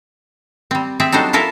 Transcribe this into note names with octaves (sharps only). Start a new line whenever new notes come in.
G3 C4
C4 G#4 E5
F#3 G3 D4 D#4 A4 C5
E4 F4 A4 A#4 E5